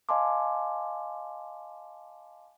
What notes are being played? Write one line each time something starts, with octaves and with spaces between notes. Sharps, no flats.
D#5 F5 G#5 A5 C6 D6